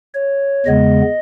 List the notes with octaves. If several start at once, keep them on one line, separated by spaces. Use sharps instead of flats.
C#5
E2 C#3 G#3 B3 D#5